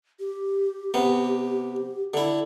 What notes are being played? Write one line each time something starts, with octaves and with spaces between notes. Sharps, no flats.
G4
C3 B3
D3 E4